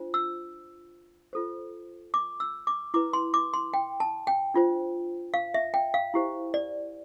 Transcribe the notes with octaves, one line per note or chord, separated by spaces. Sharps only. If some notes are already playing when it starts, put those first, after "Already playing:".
Already playing: D4 F4 C5
E6
F4 A4 C5
D6
E6
D6
E4 B4 D6
C6
D6
C6
G5
A5
G5
D4 F4 C5
F5
E5
G5
F5
E4 G4 C5
D5